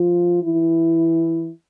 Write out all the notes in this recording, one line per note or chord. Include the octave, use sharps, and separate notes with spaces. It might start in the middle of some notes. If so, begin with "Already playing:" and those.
Already playing: F3 F4
E3 E4